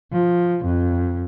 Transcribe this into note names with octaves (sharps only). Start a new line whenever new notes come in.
F3
F2